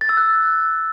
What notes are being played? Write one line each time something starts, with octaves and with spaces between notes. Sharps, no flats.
A6
E6
F#6